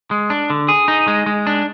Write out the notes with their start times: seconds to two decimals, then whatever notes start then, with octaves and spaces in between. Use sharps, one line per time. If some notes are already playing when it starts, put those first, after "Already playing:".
0.11 G#3
0.30 D4
0.50 D3
0.69 G#4
0.88 D#4
1.08 G#3
1.26 G#3
1.47 D4